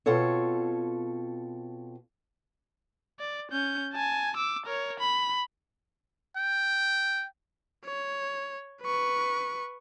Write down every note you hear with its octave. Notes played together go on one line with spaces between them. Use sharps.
B2 C4 F4 A4 C#5
D5
C#4 G6
G#5 A5
D6 E6
A#4 C#5
B5
G5
C#5
B4 C#6